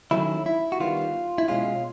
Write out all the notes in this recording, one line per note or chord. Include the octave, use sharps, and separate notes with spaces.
D#3 F#3 A3 C#4 E4
E4
F#4
D#3 G3 B3 F4
E4
B2 G#3 C#4 F4